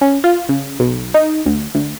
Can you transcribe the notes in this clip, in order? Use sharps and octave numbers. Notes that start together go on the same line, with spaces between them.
C#4
F4
C#3
B1
D#4
D2
D2